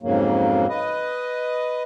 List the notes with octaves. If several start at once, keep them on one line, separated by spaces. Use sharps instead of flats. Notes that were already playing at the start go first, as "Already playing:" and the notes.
F2 G#2 C#3 F#3 A#3
B4 D#5